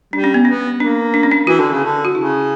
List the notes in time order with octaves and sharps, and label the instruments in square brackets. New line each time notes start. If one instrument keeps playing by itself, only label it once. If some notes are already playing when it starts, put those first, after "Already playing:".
[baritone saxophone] G3 [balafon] D4
[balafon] C#4
B3
[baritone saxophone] B3 [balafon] C#4
[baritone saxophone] A#3 [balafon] D4
[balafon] D4
C#4
D4
[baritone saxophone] E3 [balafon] F#4
[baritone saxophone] D3
C#3
D3
[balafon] F#4
[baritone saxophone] C#3 [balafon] E4